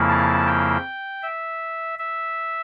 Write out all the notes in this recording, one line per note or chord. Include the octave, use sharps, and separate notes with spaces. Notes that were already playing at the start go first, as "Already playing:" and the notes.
Already playing: F2 C#3 F3 A#3 E4
A5
G5
E5
E5